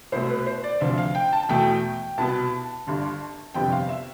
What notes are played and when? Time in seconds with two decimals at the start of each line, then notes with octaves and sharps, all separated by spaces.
0.12 C2 B2 A3 C5
0.30 B4
0.46 C5
0.64 D5
0.81 D2 C3 F3 E5
0.98 F5
1.15 G5
1.33 A5
1.43 A5
1.49 E2 B2 A3 G5
2.18 C2 B2 B3 A5
2.86 G1 G2 D3 G3
3.54 G1 F2 C3 G3 B3 G5
3.72 F5
3.89 E5